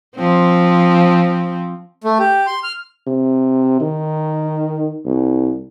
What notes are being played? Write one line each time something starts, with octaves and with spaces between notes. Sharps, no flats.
F3 C4
A3
G4
C6
F6
C3
D#3
C2